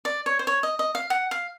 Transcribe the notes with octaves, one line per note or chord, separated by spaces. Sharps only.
D5
C#5
C5
C#5
D#5
D#5
F5
F#5
F5